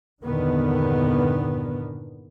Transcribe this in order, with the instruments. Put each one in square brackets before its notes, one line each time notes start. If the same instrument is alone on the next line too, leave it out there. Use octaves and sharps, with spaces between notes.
[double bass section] E2 G2 A#2 D3 D#3 B3